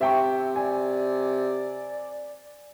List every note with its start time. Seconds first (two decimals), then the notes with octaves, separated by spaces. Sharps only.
0.01 C3 E5 G5 C#6
0.56 D5 G#5